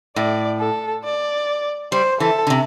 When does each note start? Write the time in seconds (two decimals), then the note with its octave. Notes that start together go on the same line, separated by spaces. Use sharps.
0.16 A2 D5
0.60 A4
1.04 D5
1.92 G3 C5
2.20 E3 A4
2.47 D3
2.50 C3